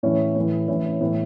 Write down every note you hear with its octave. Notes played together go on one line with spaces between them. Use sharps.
A2 E3 C#4
A2 E3
A2 E3 C#4
C#4
A2 E3 B3